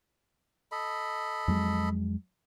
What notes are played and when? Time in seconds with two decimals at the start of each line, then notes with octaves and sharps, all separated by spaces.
0.72 A4 D#5 B5
1.48 F2 F#3 G#3